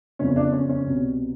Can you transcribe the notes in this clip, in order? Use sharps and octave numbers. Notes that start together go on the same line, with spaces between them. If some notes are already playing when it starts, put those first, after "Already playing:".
G1 F2 C#3 C#4
D4
C#4
C#4
C2 B2